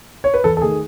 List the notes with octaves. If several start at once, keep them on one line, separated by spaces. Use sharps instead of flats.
C#5
B4
E2 A4
A4
D#3 A3 G#4